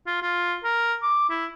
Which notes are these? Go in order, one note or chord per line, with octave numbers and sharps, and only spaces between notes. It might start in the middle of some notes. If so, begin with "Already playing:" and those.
F4
F4
A#4
D6
E4